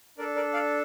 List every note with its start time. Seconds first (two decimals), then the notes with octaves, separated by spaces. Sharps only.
0.18 D4 A4 A#4 D5
0.36 A#4 D5
0.53 D5 F5